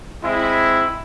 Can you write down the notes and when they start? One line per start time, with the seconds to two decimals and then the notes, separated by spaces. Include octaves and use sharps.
0.22 G#3 C4 E4